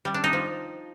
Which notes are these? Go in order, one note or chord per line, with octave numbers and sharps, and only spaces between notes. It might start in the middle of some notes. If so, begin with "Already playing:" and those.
G3
D4
D#4
F3